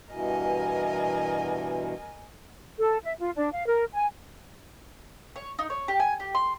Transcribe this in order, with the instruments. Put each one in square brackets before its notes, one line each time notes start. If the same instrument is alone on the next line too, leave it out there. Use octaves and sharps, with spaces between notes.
[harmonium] G2 B2 E3 [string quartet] A#4 D#5 G#5
[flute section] A4
E5
F4
D4
F5
A#4
G#5
[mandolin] C#5
D#4
C#5
G4
G#5
G4
C6